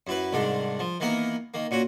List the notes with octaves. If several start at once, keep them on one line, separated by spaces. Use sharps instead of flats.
F#2 E4 B4
C2 G#2 D#3 D4
F3
D#3 E3 A#3 B3 A#4
D#3 A#3
A#2 C#4 F#4